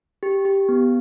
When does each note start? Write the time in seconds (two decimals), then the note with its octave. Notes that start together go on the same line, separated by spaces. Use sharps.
0.23 G4
0.45 G4
0.69 B3